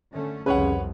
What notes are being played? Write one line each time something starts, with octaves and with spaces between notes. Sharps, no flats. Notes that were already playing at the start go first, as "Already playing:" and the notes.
D3 A3 C#4
C2 F2 C#3 B4 C#5 F#5